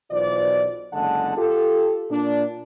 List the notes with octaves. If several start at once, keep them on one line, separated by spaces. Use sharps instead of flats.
B1 B2 E3 F4 C5 D5
F#1 D3 G#3 F#5 A5
F4 G4 A4
A#2 D4